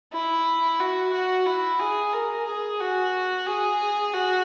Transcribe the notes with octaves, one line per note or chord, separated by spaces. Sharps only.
E4
F#4
F#4
E4
G#4
A#4
G#4
F#4
G#4
F#4